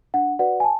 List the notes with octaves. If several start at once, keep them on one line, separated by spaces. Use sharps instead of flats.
D4 F#5
F#4 B4 D5 F#5
G#5
A5